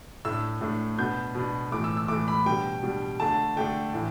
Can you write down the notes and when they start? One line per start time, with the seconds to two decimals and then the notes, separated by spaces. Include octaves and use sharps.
0.25 A2 A3 D4 E6
0.61 A2 A3 D4
0.98 B2 B3 D4 G6
1.35 B2 B3 D4
1.71 A2 E3 A3 D6
1.84 E6
1.97 E6
2.08 A2 E3 A3 D6
2.28 B5
2.46 B2 G3 D4 G5
2.83 B2 G3 D4
3.20 D3 A3 D4 A5
3.56 D3 A3 D4 G5
3.94 A2 E3